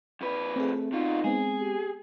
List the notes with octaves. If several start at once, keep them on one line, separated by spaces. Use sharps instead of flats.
F2 B4
A3 C4 G#4
B2 D#4 F4
G#3 B3 C4 G#4
G4